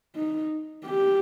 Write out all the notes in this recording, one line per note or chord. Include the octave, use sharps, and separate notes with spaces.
D#4
G4